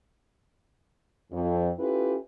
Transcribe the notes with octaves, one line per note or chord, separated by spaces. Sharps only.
F2
C#4 E4 F4 G4 A4 B4